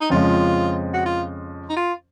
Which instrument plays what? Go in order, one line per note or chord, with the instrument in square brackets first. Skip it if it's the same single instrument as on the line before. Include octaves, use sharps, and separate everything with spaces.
[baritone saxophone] D#4
[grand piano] F2 C#3 F3 G#3 [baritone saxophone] F4
[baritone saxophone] F#4
F4
D#4
F4